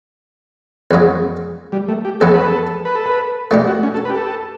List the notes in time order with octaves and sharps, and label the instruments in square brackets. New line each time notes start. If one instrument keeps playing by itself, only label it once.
[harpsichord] E2 C#3 F#3
[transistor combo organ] G3
A3
G4
[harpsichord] E2 C#3 F#3 B3 [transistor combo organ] A4
[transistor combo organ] B4
A4
B4
A4
B4
[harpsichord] B2 A3 D4 G4
[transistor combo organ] F#4
C#4
A4
B4
G4
A4